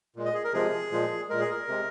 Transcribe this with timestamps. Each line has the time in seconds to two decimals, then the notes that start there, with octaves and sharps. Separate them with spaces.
0.16 A#2 G#3
0.26 D#5
0.34 G#4
0.44 A#4
0.53 C3 F3 G#3 G#4
0.92 A#2 F3 G#3
1.29 A#2 G#3 A#4
1.40 G#4
1.51 A#4
1.68 C3 G#3